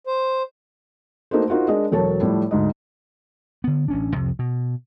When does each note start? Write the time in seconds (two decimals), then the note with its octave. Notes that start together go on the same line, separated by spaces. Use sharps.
0.07 C5
1.31 A3 A#3 D#4 F#4 A#4 C5
1.48 D#4 F4 F#4 A#4 C5
1.68 G#3 D4 A#4 D#5
1.91 E1 F#3 A4 A#4 C#5 A5
2.21 A2 F3 G3
2.51 D2 G#2 D#5
3.64 D3 B3
3.88 A1 C#4 D4
4.15 C2 F2 C3 F3
4.39 B2